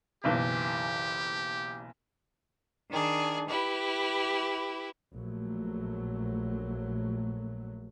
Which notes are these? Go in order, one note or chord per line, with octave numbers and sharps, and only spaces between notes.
F#1 B1 E3 G4
D#3 D4 G#4
E4 G4 B4
A#1 F#3 A3